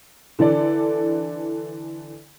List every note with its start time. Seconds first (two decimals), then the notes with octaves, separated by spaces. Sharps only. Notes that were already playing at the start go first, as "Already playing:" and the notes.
0.39 D3 E3 A4 D5